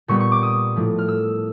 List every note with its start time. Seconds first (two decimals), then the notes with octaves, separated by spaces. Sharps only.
0.08 A#2 G3 B3 C#6
0.20 C#6
0.32 D6
0.43 D#6
0.76 A2 F3 A3
0.99 F6
1.08 E6